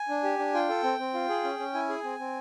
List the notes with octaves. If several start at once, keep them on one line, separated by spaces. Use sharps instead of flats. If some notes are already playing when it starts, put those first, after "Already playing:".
Already playing: G#5
D4
G4
D4
F4 G5
A4
C4
C4
F4
G#4
C#4
C#4
E4 G#5
G#4
C4
C4